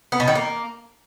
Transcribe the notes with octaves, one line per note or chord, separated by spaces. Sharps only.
B3
B2
D#3
A#3